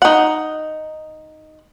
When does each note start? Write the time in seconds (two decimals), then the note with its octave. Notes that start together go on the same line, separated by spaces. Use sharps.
0.02 D#4 F#5